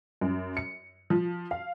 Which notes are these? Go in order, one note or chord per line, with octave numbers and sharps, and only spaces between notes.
F#2
C#7
F3
F5